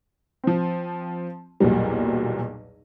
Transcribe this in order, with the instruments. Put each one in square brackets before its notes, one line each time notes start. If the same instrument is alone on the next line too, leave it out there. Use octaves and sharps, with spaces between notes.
[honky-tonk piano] F3 C4
B1 E2 A#2 F#3 G3